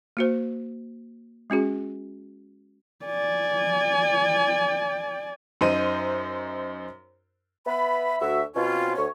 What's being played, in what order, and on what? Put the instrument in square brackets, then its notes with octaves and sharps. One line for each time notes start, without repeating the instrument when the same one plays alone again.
[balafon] A#3 F#4 C5
G#3 C#4 F#4 G#4
[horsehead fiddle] D5 G#5
[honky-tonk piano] F#2 D#4 C5 D#7
[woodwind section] B3 E5 B5
D2 F#4 E5
B2 C4 C#4 F4
D2 C#5